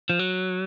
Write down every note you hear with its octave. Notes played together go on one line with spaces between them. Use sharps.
F3
F#3